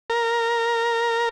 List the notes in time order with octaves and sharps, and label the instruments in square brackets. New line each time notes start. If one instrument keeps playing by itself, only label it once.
[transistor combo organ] A#4